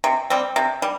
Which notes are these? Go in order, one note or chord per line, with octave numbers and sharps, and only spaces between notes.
C3
G3 C4
C3
G3